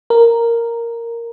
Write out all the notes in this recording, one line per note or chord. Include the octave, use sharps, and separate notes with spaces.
A#4